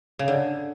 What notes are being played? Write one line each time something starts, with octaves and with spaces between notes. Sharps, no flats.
C#3
D3